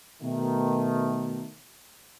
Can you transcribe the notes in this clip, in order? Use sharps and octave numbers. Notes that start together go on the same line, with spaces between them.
B2 D#3 A3